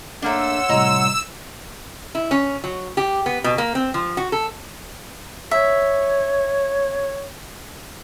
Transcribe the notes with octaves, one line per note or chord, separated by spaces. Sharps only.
A3 A#3 D4 C#5 F#5 C6 E6
A2 C3 G3 D#5 A#5
E4
C#4
F#3
G4
B3
B2
A#3
C4
F3
F#4
A4
C#5 E5